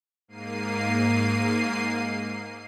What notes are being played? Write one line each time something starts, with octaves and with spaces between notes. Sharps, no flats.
G#2 A#3 C7 D#7